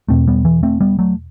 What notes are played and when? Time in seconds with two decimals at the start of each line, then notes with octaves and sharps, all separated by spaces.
0.08 E2 B2 A3 C4
0.27 G3 B3
0.45 E3
0.63 A3 C4
0.81 G3 B3
0.99 F#3 A3